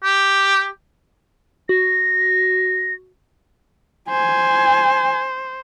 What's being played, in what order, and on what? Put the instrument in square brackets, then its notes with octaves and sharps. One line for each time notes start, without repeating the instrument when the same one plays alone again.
[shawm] G4
[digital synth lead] F#4 [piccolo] A#6
[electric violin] C5 [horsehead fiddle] G#5